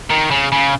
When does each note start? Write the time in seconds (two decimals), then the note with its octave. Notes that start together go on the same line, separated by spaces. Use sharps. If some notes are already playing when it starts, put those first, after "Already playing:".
0.11 D#3
0.31 C#3
0.52 C#3